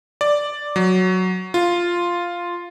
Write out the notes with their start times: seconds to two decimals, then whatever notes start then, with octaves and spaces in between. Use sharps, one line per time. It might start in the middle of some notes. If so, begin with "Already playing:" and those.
0.21 D5
0.76 F#3
1.54 F4